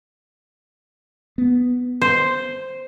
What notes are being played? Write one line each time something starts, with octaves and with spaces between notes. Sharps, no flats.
B3
C5